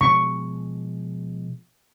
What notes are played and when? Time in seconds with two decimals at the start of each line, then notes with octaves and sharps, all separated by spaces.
0.01 B2 F3 G#3 C#6